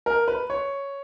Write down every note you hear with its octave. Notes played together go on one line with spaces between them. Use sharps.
A#4
B4
C#5